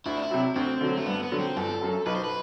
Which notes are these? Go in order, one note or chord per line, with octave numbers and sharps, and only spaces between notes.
D2 E4
D4
E4
C3 F#3
D2 C4
D3 F#3
A3
G2 B3
B3
D3 F#3
C4
G1 A4
F#2 F#3
B1 B4
C5
B4